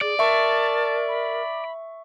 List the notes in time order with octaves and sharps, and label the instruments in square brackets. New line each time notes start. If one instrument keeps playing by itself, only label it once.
[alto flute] G#4 [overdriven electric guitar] D5
[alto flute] A#4 [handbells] E5 C#6 [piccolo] A5
[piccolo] B5